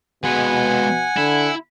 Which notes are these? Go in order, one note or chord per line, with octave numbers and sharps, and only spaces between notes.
B2 G#3 B4 F#5 G#5
D3 E4